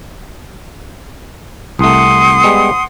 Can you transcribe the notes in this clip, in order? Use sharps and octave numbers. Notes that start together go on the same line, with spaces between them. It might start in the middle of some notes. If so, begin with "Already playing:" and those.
C2 A3 F#5 C6 D#6
G3 G#3 B3